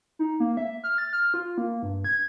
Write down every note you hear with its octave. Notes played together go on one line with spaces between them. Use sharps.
D#4
A#3
E5
F6
A6
F6
F4
A#3
G2
G#6